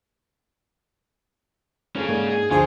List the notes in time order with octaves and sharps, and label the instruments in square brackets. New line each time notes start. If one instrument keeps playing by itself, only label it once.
[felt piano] C4 A4 [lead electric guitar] C#4 G#4
[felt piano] G#2 A#3 D5
[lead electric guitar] G#4
[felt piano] D2 D4 C#6 [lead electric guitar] F4 C5 [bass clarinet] G#4